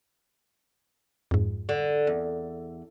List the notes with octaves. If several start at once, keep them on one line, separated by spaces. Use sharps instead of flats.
F2 G#2
D3
E2